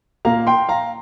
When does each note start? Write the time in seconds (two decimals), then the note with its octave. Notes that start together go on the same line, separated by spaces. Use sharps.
0.25 A#2 A#3 F5 A#5
0.47 G5 C6
0.69 F5 A#5